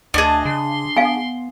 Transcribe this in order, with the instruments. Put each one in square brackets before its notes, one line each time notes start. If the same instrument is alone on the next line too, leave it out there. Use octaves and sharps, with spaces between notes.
[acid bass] D2 [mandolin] D4 G#4 [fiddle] D#5 A5
[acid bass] C#3 [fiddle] C6
[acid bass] B3 [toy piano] F5 G#5